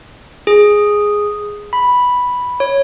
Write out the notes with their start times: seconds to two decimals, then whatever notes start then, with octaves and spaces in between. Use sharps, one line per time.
0.47 G#4
1.73 B5
2.60 C#5